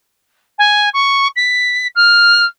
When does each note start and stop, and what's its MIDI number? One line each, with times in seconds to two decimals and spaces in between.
0.58 0.89 80
0.94 1.28 85
1.36 1.87 95
1.95 2.45 89